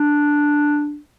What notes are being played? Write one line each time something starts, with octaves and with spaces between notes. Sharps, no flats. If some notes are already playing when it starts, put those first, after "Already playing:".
Already playing: D4